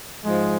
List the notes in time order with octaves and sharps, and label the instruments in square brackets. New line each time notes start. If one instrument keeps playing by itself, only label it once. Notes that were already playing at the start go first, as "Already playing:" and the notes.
[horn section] G#2 F3 G#3